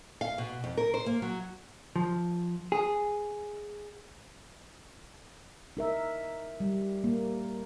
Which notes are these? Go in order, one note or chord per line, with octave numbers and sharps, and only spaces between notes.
F5
B2
F2
A#4
C5
A#3
F#3
F3
G#4
D#4 A#4 E5
G3
A#3